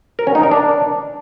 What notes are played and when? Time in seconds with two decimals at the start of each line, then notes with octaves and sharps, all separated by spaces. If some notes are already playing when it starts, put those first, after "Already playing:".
0.19 A#4
0.27 C#4
0.35 D#4
0.43 A#4
0.51 D4